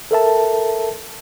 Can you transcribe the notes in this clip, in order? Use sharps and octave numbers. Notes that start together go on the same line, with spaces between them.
A4 A#4 E5 A5